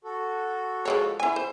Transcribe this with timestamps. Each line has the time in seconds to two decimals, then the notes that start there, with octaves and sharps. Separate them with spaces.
0.04 F#4 A4
0.85 F3 G#3 C#5
1.20 E4 G#5
1.36 C5